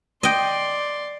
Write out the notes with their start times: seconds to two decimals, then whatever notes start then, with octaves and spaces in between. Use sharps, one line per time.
0.23 D5 D#5 G5 C6